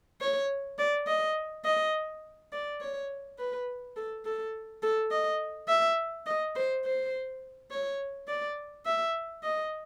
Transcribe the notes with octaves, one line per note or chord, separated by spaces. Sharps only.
C#5
D5
D#5
D#5
D5
C#5
B4
A4
A4
A4
D#5
E5
D#5
C5
C5
C#5
D5
E5
D#5